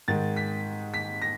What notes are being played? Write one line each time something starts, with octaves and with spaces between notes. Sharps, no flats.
G#2 D#3 G#3 A6
B6
B6
A#6